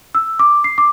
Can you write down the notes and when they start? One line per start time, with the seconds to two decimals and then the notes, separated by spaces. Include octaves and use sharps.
0.15 E6
0.39 D6
0.64 C7
0.78 D6